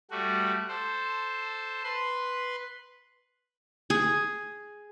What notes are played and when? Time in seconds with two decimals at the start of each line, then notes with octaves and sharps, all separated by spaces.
0.11 G3 A3 F#4
0.68 A4 C5
1.84 B4 C6
3.90 G#4